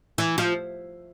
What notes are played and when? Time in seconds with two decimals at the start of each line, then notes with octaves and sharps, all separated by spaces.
0.18 E3
0.38 F3